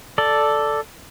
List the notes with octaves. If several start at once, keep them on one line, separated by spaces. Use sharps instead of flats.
A4 D5